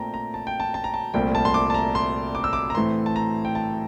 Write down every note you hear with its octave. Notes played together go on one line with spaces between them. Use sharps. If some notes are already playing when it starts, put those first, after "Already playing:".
Already playing: A#2 A3 C4 G5 A5 A#5
A#5
A5
G5
A5
A5
A#5
A5
C2 A#2 A3 C4 G5
A5
C6
D6
A5
A#5
C6
D6
E6
D6
A#5
A2 E3 A3 C4 C6
A5
A#5
G5
A5